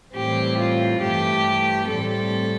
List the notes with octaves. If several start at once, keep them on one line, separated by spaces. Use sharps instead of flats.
A2 E3 G3 C4 G4
F4
G2 E3 A3 G4
A2 G3 C4 A4